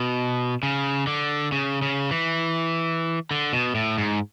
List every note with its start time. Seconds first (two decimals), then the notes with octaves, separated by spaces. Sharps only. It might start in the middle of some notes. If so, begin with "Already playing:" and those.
Already playing: B2
0.63 C#3
1.07 D3
1.52 C#3
1.82 C#3
2.11 E3
3.31 D3
3.53 B2
3.75 A2
3.98 G#2